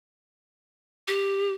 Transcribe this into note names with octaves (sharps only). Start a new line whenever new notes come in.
G4